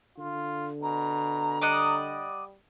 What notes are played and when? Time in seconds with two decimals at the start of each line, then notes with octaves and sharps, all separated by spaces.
0.18 D3 F4
0.82 B2 A#5
1.61 G3 D5 D#5 F#5